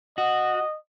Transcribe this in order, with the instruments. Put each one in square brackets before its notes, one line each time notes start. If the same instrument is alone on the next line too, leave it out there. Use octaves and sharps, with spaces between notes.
[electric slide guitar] F#4 [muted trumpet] D#5